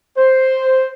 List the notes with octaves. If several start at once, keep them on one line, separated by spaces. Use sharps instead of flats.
C5